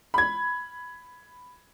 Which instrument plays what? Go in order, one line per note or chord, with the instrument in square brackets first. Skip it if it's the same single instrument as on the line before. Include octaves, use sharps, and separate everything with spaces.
[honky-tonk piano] B5 G#6